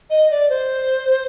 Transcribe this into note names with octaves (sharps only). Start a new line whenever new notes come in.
D#5
D5
C5